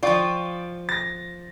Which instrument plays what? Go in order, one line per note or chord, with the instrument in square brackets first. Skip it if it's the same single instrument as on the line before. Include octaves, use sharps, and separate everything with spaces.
[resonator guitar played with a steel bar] F3 F4 [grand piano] D5 G5 C#6
[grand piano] A6 A#6